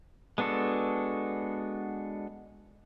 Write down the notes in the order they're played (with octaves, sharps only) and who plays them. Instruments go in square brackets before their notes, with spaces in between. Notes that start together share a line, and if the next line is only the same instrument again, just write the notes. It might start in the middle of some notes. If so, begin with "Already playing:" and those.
[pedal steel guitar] G#3 B3 D4 F#4 A4